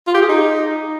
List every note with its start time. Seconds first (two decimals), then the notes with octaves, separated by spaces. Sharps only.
0.07 F4
0.15 G4
0.22 G#4
0.29 D#4